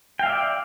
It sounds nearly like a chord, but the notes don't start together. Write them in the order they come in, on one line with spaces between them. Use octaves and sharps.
G5 F5 E5 D5